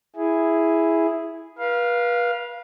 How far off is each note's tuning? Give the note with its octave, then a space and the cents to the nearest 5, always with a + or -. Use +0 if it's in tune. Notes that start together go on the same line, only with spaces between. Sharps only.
E4 +0 G#4 +0
B4 -35 F5 +0